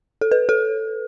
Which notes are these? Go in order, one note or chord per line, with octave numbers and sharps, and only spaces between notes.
A4
B4
A4